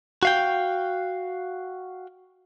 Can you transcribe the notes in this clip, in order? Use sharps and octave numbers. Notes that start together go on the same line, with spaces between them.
F#4 F5 G5